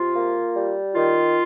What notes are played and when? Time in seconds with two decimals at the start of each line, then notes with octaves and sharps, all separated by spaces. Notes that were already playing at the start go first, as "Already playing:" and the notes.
Already playing: C3 F4
0.14 A#3
0.54 G3
0.94 D#3 F4